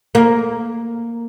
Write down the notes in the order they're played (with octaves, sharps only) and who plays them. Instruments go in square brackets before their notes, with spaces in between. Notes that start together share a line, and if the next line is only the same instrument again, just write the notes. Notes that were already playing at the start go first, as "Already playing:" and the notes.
[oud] A#3